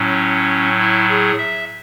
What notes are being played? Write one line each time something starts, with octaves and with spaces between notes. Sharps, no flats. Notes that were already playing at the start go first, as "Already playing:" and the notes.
Already playing: A2 F#3 C#4
E4
G#4
E5